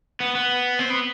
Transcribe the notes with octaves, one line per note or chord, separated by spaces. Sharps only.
B3
B3
C4
B3